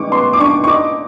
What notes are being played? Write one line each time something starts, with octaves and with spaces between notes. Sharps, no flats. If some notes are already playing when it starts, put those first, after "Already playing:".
Already playing: E3 G#3 C#6 D6
B3 C6
D6
D4 C#6
C#6
D#4 D6